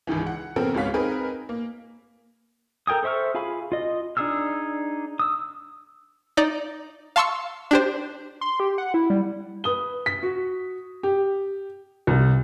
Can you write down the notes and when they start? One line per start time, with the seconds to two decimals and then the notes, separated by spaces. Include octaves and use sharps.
0.07 C#2 G#2 D#3 E3
0.27 F#5
0.56 C#3 F3 B3 C4 A4 A#4
0.74 C#2 G#2 F#4 C#5 F5 B6
0.94 C4 D#4 G#4 A#4 B4
1.49 A#3
2.87 A4 A#4 G5 G#5 D#6
3.03 A4 C5 E5 C#6 F6
3.35 F4 G#4 F5 G#5 B5
3.72 F4 D#5
4.17 D4 D#4 G#4 E6 F6
5.20 D#6 E6
6.37 D#4 D5
7.16 F5 A5 C6 C#6 E6 C#7
7.71 D4 G4 C5
8.41 C6
8.60 G4
8.78 F#5
8.94 E4
9.10 G3
9.64 B4 D#6 G7
10.06 B6
10.23 F#4
11.03 G4
12.07 C2